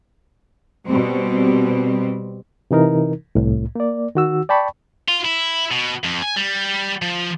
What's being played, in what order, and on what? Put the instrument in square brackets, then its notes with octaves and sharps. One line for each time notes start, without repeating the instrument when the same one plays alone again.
[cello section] B2 G3 C4
[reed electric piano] C3 E3 D#4 A#4
C2 A2
A#3 D5
D#3 F#4 E6
D5 G5 A5 B5 C#6
[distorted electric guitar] F4
E4
B2
F2
G#5
G3
F3